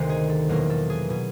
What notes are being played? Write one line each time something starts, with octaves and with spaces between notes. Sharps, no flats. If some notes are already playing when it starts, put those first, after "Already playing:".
Already playing: D2 C3 D#3 G#3 C5
G#4
A4
E2 B2 F#3 A#3 A#4
A4
G#4
B2 G#4